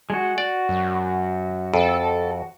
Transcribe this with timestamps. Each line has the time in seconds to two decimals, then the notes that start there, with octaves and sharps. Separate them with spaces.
0.10 G#3 F#4
0.38 F#4 D5
0.69 F#2
1.74 F2 A4